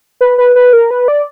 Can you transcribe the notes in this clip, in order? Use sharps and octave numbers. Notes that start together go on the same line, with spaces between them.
B4
B4
B4
A#4
B4
D5